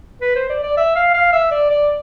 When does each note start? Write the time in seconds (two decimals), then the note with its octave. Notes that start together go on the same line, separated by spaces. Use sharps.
0.21 B4
0.36 C5
0.50 D5
0.63 D5
0.77 E5
0.96 F5
1.14 F5
1.33 E5
1.51 D5
1.70 D5